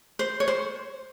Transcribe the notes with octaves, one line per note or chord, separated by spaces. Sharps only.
C5
C#5
C5